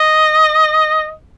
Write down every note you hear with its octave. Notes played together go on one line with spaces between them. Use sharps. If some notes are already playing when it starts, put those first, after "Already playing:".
Already playing: D#5